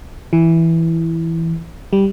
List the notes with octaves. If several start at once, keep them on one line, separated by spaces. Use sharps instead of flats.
E3
G3